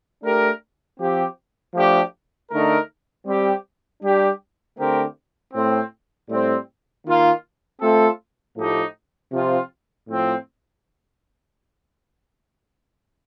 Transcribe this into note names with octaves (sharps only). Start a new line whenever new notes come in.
A3 D4 G4 A#4
F3 C4 G4
F3 A3 D4 G4
D3 A3 D#4 A#4
G3 C4 G4
G3 D4 G4
D3 A3 C4 G4 A#4
A2 A3 C4
A2 G3 C4
D#3 A#3 F4
A3 C4 F4 A4
A2 F3 A3 D#4 G4
C3 F3 C4 F4
A2 F3 C4